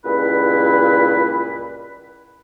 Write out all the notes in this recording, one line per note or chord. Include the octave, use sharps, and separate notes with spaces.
C#2 G2 A#2 E4 B4 B5